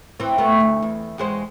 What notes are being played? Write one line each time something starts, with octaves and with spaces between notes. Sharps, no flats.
E3 C4
A3 B3
D2
E2
E2 G#3 C5